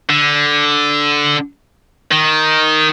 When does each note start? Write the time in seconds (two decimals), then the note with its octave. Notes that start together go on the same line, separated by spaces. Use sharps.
0.09 D3
2.11 D#3